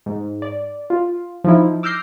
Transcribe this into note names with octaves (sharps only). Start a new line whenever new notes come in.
G#2
D5
F4
F3 D#4 E4
D6 E6 F6 G6 A#6 C7